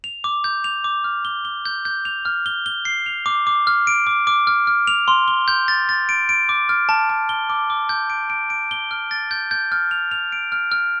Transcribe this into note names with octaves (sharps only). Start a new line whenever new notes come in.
F7
D6
G6
F7
D6
F6
G7
G7
G6
G6
F7
F6
G7
G7
C7
F7
D6
D6
F6
D7
D6
D6
F6
F6
F7
C6
G7
G6
A6
A6
D7
D7
D6
F6
A5
A5
G7
D6
D6
G6
D7
D7
D7
G7
F6
A6
G6
G6
F6
F7
F7
D7
F6
F6